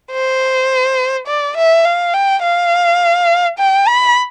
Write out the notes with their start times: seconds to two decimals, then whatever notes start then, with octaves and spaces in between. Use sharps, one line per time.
0.12 C5
1.27 D5
1.57 E5
1.85 F5
2.14 G5
2.43 F5
3.59 G5
3.88 B5